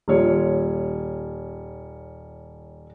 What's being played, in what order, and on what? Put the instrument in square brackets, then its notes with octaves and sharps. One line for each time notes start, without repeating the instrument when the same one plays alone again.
[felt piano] D#1 F4 C#5